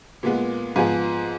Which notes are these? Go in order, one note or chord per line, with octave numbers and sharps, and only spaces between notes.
A#2 G#3 B3
G#2 F3 B3 G#5